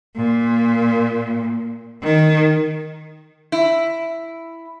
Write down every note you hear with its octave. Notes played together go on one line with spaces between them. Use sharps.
A#2
D#3
E4